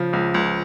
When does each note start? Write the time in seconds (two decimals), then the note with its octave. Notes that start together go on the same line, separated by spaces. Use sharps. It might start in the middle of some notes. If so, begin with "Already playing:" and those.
Already playing: C#3 F3
0.13 C#2
0.34 C#2